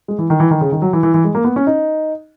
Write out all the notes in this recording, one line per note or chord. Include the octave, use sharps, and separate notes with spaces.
G#3
E3
D#3
E3
D#3
C#3
D#3
F#3
E3
E3
E3
G#3
A#3
B3
C#4
D#4